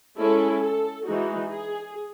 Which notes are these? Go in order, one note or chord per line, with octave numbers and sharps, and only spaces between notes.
G#3 C#4 E4 A4
A4
E3 G#3 D#4 F#4
G#4